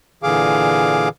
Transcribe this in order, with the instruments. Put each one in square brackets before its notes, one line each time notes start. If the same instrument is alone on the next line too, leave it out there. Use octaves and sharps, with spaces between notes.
[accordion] A#2 D3 E3 G#4 F5 D6